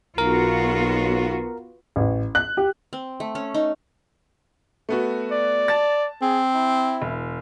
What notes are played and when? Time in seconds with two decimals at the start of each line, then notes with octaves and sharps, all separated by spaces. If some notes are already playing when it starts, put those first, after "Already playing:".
0.18 B1 B3 F4 F#4 A#4
1.96 A1
2.35 F#6
2.57 G4
2.93 C4
3.20 A3
3.35 C#4
3.54 D#4
4.89 A3 B3 F#4
5.32 D5
5.68 A5 A6
6.22 C4 G#4
6.55 E4
7.02 E1